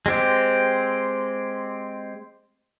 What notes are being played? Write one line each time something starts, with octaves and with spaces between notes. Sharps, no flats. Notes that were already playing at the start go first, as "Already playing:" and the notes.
G#3 C4 G4